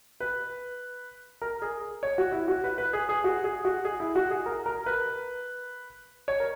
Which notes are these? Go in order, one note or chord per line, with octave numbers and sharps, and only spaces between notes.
B4
A#4
G#4
C#5
F#4
E4
F#4
B4
B4
G#4
G#4
F#4
G#4
F#4
G#4
E4
F#4
G#4
A#4
A#4
B4
C#5
A#4